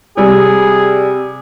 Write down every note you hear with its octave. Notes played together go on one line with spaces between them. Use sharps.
C3 G3 G#4